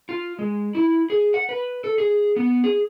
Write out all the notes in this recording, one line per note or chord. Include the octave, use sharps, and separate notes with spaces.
F4
G#3
E4
G#4
F#5
B4
A4
G#4
B3
G#4